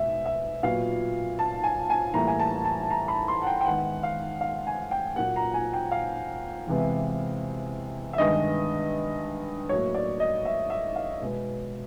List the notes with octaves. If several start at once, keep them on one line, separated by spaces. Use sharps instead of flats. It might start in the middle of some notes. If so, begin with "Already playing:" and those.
Already playing: B2 G#3 E5
E5
A#2 F#3 B3 F5
A5
G#5
G#5
A2 E3 G3 A#3 A#5
G#5
A5
A5
A#5
B5
C6
F#5
G5
G5
G#2 D#3 G#3 B3 F#5
F5
F5
G#5
G5
A#2 F#3 A#3 F#5
A#5
G#5
G5
F5
E2 C3 E3 G#3 B3
E5
G2 D#3 G#3 B3 D#5
A2 F#3 A#3 C#5
D5
D#5
E5
E5
F5
B2 G#3 B3